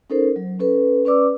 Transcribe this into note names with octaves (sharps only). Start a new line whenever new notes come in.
C#4 D#4 A4 A#4 C5
F#3
C#4 A4 B4
C#4 B4 D5 D6 E6